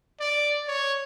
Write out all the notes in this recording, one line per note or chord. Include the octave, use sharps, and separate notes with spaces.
D5
C#5